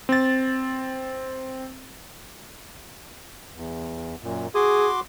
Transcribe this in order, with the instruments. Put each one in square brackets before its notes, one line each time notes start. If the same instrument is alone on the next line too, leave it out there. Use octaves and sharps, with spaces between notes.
[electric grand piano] C4 A6
[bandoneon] E2
F#2 A#2
[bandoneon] F#4 C6 D6 [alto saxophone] G#4